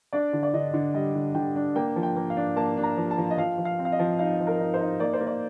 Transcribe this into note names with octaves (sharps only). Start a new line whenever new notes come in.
D4 D5
D3
D5
D3 D#5
D3
G3 D#5
D3
D3 G5
D4
A#3 G5
F3
G5
A#3
F5
D4
A#3 A5
D4
A#5
F3
A5
F3
D#5
F3 F5
F3
F5
C4
F5
D#5
F3
D#4 F5
F3
A#4
D#4
C5
D#4
A#3 D5
C5
A#3
D5